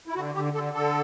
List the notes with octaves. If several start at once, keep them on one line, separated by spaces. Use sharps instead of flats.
E4
D3 F#4
D3 G4
D3 A4
D3 A4